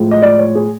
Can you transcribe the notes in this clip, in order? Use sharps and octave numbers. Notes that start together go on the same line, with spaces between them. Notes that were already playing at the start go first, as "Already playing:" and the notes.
Already playing: A2 F3 G#3
D#5
D5
C#5
G#4